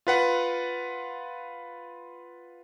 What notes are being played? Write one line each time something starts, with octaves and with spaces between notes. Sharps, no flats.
F4 B4 F#5